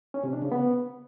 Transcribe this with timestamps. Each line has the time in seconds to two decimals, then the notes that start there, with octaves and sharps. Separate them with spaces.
0.14 C#4
0.24 C3
0.33 D4
0.42 C#3
0.52 B3